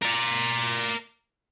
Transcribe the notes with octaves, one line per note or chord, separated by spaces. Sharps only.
A#4 D5